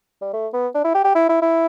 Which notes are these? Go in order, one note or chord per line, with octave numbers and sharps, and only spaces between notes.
G3
A3
B3
D4
E4
G4
G4
E4
E4
E4